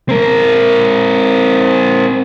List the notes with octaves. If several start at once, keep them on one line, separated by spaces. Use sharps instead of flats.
C4 A#4